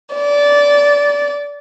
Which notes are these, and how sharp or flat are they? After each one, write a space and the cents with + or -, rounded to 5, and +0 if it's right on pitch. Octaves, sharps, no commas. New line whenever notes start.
D5 -20